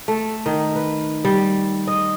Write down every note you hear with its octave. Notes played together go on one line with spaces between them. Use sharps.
A3
D#3
B4
G3
D#5